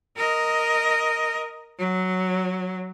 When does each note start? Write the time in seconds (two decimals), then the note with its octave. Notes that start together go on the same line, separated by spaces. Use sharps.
0.17 A#4 D#5
1.79 F#3